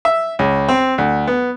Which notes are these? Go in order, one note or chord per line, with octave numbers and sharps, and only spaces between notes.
E5
C#2
C4
D2
B3